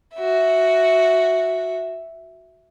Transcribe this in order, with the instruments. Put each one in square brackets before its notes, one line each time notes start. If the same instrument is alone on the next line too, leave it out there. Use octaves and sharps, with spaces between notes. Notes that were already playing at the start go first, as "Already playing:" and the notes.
[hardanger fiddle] F#4 E5